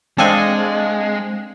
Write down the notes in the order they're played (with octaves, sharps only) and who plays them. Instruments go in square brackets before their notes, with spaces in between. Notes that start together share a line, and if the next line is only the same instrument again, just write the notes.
[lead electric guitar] G#3 [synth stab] C4 [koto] D4 A4 G#5 [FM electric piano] D#5 F5 A5